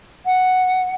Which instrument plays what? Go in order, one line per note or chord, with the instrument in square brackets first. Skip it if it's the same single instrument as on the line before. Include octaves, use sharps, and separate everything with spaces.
[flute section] F#5